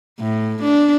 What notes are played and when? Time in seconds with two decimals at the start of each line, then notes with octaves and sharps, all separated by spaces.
0.20 A2
0.63 D4